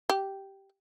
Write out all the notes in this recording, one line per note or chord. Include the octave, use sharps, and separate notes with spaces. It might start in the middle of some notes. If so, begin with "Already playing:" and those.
G4